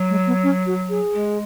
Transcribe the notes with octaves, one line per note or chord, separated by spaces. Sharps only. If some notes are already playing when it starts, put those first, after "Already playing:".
Already playing: F#3
G#3
B3
C#4
F#4
G#4
G#3